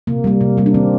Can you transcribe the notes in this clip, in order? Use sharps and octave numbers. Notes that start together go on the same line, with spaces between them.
C3 A#3
G3 A#3
C3
G3 A#3
D4
D#3 C4